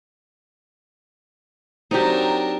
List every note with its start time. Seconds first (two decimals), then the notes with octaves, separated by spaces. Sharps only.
1.91 F#3 C4 D4 D#4 G4 A#4